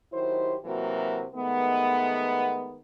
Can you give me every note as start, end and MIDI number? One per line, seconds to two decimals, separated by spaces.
0.12 0.55 51
0.12 0.55 54
0.12 0.55 64
0.12 0.55 67
0.12 0.55 72
0.64 1.24 48
0.64 1.24 52
0.64 1.24 54
0.64 1.24 58
0.64 1.24 66
0.64 1.24 70
1.35 2.79 51
1.35 2.79 56
1.35 2.79 57
1.35 2.79 59